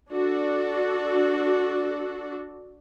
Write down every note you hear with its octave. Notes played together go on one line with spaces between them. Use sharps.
D4 F#4 A4